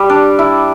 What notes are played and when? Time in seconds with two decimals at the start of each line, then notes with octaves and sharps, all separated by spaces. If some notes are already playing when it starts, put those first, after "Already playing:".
Already playing: G3 G4
0.09 D4
0.39 E4